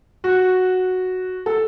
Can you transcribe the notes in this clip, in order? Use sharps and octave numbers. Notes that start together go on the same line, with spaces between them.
F#4
A4